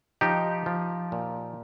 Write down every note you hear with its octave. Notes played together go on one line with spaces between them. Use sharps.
F3 D#4 G4
F3
A#2